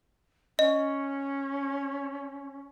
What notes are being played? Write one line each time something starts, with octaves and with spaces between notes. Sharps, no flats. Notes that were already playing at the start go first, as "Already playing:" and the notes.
C#4 D#5